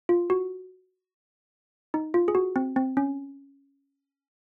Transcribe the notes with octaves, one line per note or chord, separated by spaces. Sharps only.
F4
F#4
D#4
F4
G#4
F#4
C4
C4
C#4